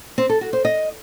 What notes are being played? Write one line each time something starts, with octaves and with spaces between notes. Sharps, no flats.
C4
A4
F#4
C5
D#5